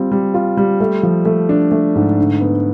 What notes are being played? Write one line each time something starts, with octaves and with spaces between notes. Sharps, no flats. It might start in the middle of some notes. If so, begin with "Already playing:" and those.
Already playing: G3 C4 F4
G3
F4
G3
A3
F3
A3
D4
A3
G#2
D3
B3